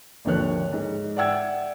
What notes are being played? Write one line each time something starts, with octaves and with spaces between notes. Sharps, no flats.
G#1 D#2 D3 F3 C#5 F#6
G#2
D5 E5 F#5 G5 E6 G#6